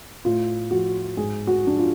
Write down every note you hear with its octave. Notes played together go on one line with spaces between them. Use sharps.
A2 F4
F3 F#4
G#2 G#4
F#4
F3 D4
F4